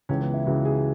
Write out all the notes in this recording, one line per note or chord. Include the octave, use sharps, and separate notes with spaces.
C#2 C#3 E3 C#4
B3
E4
C#2 C#3 E3 F#4
G#4